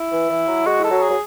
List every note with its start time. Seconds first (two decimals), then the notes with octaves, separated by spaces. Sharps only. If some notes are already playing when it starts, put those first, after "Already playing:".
Already playing: E4
0.12 E3
0.30 E3
0.48 F#3
0.66 G#3 F#4
0.79 E3
0.84 A4
0.91 F#3
1.02 G#4
1.09 F#3